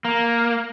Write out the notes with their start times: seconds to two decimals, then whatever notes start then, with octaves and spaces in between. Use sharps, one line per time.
0.05 A#3